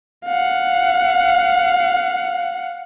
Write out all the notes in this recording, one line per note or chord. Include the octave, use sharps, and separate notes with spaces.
F5 F#5